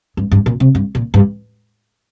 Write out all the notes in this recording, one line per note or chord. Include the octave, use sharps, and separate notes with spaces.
G2
G2
A#2
C3
G2
A#2
G2